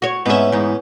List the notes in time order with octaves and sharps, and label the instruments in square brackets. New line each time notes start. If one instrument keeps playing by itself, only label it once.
[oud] F#4 C#5
[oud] G#2 E5 [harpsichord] B3 C#4
[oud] E2 G#2